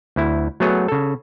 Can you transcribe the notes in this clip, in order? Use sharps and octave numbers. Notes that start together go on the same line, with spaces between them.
D2 E4
F#3 A3 B3 G#4 C#5
C#3 A4